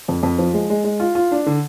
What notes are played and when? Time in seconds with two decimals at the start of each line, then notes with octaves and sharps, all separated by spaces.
0.08 F2
0.23 F2
0.39 F3
0.54 G#3
0.70 G#3
0.84 G#3
1.00 F4
1.15 F4
1.32 D4
1.46 D3